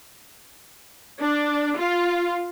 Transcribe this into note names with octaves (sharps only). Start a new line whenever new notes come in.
D4
F4